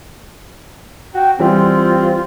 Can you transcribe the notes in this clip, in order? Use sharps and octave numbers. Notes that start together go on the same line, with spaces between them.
F#4 G5
E3 G3 C4 F4